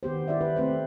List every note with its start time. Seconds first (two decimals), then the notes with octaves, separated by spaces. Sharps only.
0.03 D#3 B3 G4 C5
0.27 E4 G4 D5 E5
0.41 D#3 E4 B4
0.56 A3 C4 B4 C5